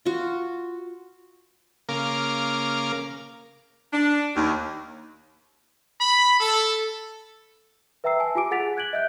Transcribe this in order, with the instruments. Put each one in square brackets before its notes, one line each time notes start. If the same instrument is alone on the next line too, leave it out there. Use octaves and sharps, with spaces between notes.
[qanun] F4 F#4
[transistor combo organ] C#3 A#3 A#4 F5 D6
[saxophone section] D4
D#2
[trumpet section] B5
A4
[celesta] B4 E5 G5 A#5 E6 C7
G#5 A5 E6
F4 G4 G#5 D6 D7
G#4 F#5 A6 B6 F7
F#6 G#6 D7 F#7 G7
D#5 E5 F#6 G6